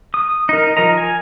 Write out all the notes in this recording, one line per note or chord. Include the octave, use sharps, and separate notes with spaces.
D#6
D#4 A#4
F3 A#4 D#5 A#5
G#5